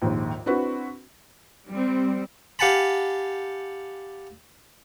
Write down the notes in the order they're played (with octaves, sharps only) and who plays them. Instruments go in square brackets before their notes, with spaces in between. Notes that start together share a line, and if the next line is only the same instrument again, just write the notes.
[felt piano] A#1 D#2 G#2
C4 D4 E4 F#4 B4
[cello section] G3 C4
[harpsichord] G4 F5 F#5 G#5 A5 B5